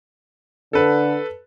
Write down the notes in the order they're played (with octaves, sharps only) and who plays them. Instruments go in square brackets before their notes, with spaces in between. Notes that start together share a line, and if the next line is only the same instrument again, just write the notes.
[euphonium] D3 [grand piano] A4 B4